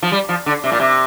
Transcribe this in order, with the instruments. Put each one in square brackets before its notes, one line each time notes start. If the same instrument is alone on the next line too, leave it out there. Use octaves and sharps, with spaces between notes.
[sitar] F3
G3
F3
D3
C3
A#2
C3